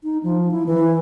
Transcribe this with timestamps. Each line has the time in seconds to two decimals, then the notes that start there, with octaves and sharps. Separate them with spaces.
0.04 D#4
0.23 F3
0.51 E4
0.66 E3